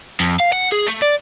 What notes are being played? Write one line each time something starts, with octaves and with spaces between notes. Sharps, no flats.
F2
F5
F#5
G#4
A3
D5